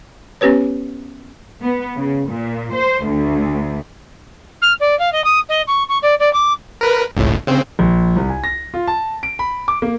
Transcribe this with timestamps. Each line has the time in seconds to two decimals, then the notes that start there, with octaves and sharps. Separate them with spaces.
0.41 B3 C#4 G4 B4 C#5
1.62 B3
1.96 C#3
2.28 A#2
2.76 C5
3.05 D2
4.61 F6
4.80 D5
4.99 F5
5.12 D#5
5.24 D#6
5.49 D#5
5.67 C#6
5.88 C#6
6.02 D5
6.19 D5
6.33 D6
6.81 A#4 B4
7.15 G1 C#2 A2
7.47 C#3 C4
7.79 A#1
8.16 C2
8.29 G#5
8.44 A#6
8.74 F4
8.87 A5
9.23 D7
9.39 B5
9.68 D6
9.82 A#3